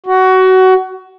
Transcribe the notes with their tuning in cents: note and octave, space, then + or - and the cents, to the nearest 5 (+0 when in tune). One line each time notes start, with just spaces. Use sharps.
F#4 +20